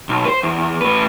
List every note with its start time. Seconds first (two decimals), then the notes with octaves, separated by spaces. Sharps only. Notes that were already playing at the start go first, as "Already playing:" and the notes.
0.09 B1
0.25 B4 C5
0.43 E2
0.81 A2 B4